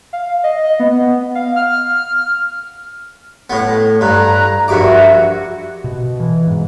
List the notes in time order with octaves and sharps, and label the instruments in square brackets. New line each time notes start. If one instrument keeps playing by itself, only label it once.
[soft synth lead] F5
D#5
B3
F5
F6
[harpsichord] A2 B3
[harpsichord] G2 [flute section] A#5 F#6
[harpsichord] A#1 G2 D6 [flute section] F#4 E5
[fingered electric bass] B2
E3
G#2